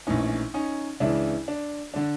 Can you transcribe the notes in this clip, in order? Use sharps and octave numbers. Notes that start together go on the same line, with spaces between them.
A#1 A2 E3 C#4 D#4
C#4 D#4
C#2 C#3 E3 D4 E4
D4
D3 D4